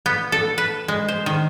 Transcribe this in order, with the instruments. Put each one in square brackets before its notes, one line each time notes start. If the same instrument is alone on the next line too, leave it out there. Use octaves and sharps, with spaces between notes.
[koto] B3
A4
B4
G#3
C5
D#3